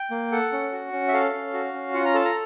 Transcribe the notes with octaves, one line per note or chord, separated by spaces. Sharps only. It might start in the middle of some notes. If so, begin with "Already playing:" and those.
Already playing: G5
A#3
A4 F#5
C#4
F#4
C#4
E5
A4 F5
C#4
F#4
C#4
F4 F#5
A#5
A4 A5
A#5